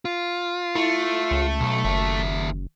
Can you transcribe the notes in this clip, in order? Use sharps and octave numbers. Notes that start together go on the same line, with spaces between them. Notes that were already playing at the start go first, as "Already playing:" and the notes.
F4
A3 E4
C#2
B1
F#1 D#2 E5